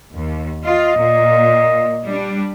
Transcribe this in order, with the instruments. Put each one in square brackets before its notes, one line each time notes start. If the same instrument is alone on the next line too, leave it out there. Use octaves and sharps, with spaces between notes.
[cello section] D#2
[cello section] F4 [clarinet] D#5
[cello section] A#2
G3 D4